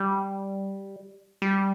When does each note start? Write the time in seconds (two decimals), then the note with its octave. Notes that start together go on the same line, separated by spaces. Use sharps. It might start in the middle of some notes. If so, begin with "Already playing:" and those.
Already playing: G3
1.42 G3